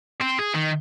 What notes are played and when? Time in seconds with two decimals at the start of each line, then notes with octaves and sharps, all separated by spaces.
0.21 C4
0.39 G#4
0.54 D#3